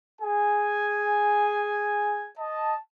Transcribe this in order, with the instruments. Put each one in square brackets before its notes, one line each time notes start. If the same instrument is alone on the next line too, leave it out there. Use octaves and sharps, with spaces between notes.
[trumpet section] G#4 G#5
D#5 A5